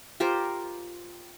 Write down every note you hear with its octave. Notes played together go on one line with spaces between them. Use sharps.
F4 G4 A#4 C5